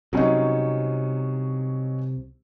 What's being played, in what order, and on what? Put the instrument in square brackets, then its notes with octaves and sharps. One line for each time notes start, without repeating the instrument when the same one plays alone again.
[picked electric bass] C2 C3 [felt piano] F#3 C#4 D#4